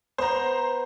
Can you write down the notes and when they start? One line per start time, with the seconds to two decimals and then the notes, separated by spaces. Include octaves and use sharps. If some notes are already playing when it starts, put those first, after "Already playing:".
0.18 B3 C5 A#5